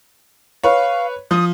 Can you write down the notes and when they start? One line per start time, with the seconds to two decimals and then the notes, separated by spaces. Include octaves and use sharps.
0.64 B4 C#5 F5
1.31 F3 D#6